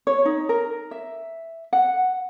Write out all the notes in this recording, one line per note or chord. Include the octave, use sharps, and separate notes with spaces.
C#5
D#4
A#4
E5
F#5